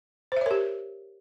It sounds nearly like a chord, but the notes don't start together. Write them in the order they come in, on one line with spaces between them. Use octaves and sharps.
C5 E5 C#5 A#4 G4